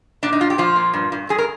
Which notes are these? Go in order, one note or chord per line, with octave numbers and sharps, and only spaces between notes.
A#2 D4
D#4
A#2 F4
G4
F3 F4
A#2
G2
G2
G2 G#4
A#4